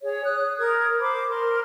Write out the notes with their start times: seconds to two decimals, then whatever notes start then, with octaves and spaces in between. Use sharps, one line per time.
0.02 G#4 C#5
0.24 D#6 F#6
0.57 A#4 D#6 G#6
0.99 C5 B5 D6
1.27 A#4 C6